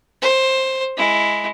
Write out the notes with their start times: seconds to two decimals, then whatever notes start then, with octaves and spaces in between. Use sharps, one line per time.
0.22 C5
0.97 G#3 E4